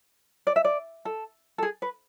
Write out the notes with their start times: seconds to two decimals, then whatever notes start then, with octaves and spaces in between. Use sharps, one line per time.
0.47 D5
0.56 E5
0.65 D5
1.05 A4
1.58 A4
1.63 G#4
1.82 B4